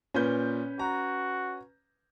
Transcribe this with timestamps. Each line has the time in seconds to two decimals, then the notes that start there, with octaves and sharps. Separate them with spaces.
0.14 A#2 C#4 B4 G6
0.79 F#4 A#5